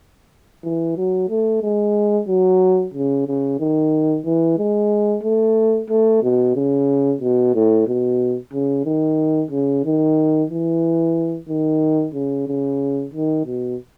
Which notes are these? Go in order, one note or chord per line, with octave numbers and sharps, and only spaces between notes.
E3
F#3
A3
G#3
F#3
C#3
C#3
D#3
E3
G#3
A3
A3
B2
C#3
B2
A2
B2
C#3
D#3
C#3
D#3
E3
D#3
C#3
C#3
D#3
B2